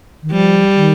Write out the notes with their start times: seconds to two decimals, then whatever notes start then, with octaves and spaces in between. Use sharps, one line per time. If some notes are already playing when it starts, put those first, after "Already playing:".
0.23 D#3
0.32 F3 G3
0.75 D#3